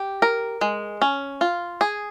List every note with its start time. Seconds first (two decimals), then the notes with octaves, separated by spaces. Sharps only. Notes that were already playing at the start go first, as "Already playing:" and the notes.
Already playing: G4
0.22 A#4
0.61 G#3
1.02 C#4
1.41 F4
1.81 G#4